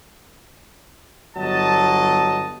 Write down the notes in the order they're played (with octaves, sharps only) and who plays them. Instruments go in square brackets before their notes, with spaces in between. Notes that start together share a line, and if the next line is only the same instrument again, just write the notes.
[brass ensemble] G1 F#3 D#5 A5